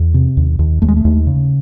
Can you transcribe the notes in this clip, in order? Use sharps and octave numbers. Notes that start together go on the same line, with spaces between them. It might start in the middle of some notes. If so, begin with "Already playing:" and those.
Already playing: E2
C3
D#2
D#2
D#2 A3
G#3
A3
D#2
C#3